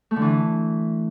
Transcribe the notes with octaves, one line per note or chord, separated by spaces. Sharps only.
A3
D3
E3